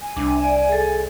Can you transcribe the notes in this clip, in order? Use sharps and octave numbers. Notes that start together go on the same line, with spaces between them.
G#5
C2 D4
D5 E5
G#4 A4